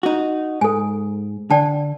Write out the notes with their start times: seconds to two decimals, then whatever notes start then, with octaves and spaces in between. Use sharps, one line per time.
0.03 D#4 F#4
0.61 G#2 A4 G#5
1.50 D3 D5 G5 A5